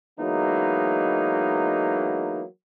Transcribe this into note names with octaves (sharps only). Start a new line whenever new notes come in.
E3 F#3 G#3 A#3 B3 D#4